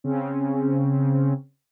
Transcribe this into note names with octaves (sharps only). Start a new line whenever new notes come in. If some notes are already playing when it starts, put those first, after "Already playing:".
C#3 C4 C#4